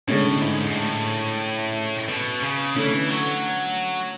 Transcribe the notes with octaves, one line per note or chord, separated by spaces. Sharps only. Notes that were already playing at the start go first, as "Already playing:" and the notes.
A2 D3 G#3 C#4
G#2
G#2
A2
B2
C#3
D3 E3 A3 C#4
F#3